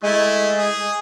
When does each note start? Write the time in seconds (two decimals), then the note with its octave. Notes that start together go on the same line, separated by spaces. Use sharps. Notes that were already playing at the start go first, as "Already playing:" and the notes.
0.03 G#3 A3 E4
0.58 G#4